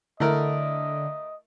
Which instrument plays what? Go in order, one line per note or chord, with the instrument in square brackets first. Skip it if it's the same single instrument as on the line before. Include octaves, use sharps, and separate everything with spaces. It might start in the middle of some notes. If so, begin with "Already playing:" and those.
[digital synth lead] D3 [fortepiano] A3 E4 A#4 [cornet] D#5